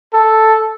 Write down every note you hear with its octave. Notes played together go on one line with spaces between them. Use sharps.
A4